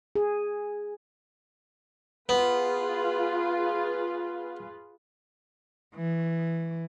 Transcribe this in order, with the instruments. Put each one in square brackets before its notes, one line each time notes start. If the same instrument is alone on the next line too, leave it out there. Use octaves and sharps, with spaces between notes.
[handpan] G#4
[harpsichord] B3 [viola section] F4 G#4 B4
[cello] E3